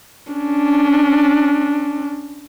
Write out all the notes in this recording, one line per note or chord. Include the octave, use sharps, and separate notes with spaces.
C#4 D4